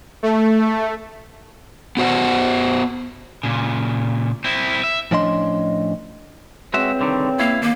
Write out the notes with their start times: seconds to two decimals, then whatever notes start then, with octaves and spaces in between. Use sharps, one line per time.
0.23 A3
1.97 B3 F#4 C5 F#5
3.43 A#2 C#3
4.45 C4 E4
4.84 E5
5.11 A2 F3 C#4 D4 D#5 C6
6.74 C#3 E3 G#3 C4 F#4 E5
6.99 C2 D3 D#3
7.40 A#3 E4 F5
7.62 D#2 A#3